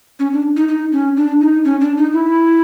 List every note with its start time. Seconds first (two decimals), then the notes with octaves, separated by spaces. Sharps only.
0.19 C#4
0.33 D4
0.56 D#4
0.69 D#4
0.92 C#4
1.17 D4
1.41 D#4
1.65 C#4
1.81 D4
1.97 D#4
2.13 E4